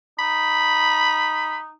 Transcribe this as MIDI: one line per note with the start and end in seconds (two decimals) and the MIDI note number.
0.19 1.72 63
0.19 1.58 83